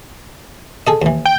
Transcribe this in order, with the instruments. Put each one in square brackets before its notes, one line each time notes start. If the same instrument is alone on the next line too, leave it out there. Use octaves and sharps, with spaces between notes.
[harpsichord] G#4 A4 D#5
D#2 E3
[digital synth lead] G5